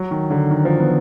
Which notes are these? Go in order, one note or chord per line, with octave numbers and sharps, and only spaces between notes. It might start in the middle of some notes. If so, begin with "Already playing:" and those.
Already playing: F#3
D#3
D3
D#3
F3
B3